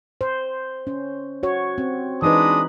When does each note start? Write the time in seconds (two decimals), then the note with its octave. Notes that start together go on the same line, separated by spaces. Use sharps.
0.21 C5
0.87 C#4
1.43 F#4 C#5
1.78 C4
2.22 E3 G#3 D4 D#4 B4 D#6